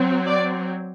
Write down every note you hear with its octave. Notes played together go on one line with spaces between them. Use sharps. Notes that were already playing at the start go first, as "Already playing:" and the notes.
Already playing: F#3 C4
D5